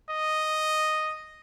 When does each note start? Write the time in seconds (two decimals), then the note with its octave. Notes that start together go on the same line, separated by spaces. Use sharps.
0.10 D#5